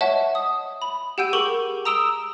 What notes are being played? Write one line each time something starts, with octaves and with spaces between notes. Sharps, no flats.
C#5 D#5 E5 F#5 A5 C#6
D#6
B5
G4 F#5 G5 E6 G6 D#7
G#4 A#4 C#6 D6 F#7
A#5 D#6 E6 D7 E7 G7